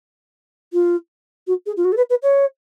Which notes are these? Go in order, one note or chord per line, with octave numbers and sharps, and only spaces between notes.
F4
F#4
G#4
F4
F#4
A4
B4
B4
C#5